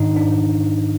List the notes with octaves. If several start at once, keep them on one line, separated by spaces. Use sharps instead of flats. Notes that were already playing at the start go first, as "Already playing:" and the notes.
Already playing: G#2 D#3 D4 D#4
D4